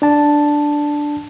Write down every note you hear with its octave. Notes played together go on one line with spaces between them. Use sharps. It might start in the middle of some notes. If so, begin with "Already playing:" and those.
D4 A5